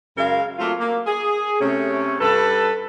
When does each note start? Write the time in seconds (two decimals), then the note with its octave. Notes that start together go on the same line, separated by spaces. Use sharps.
0.17 F#2 C#3 F#3 G#3 A#4 F5
0.58 F#3 A3 A#3 C4 F4
0.78 A#3
1.06 G#4
1.60 C3 A3 C#4
2.20 G2 A4 B4